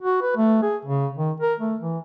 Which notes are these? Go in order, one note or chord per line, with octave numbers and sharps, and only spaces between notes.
F#4
B4
A3
G#4
C#3
D#3
A#4
A3
E3